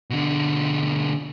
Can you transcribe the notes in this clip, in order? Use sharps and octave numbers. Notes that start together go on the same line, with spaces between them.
B2 D3